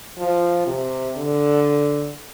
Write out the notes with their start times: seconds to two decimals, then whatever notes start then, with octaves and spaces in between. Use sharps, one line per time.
0.18 F3
0.67 C3
1.17 D3